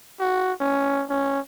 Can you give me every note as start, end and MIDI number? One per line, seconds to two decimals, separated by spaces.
0.20 0.52 66
0.61 1.04 61
1.10 1.39 61